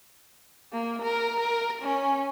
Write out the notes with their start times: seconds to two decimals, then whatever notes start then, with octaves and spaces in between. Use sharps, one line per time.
0.73 A#3
1.03 A#4
1.40 A#4
1.82 C#4